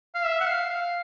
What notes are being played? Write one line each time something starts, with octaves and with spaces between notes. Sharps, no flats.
F5
E5
F#5
F5
F5